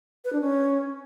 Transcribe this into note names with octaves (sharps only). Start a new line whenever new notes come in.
B4
D4
C#4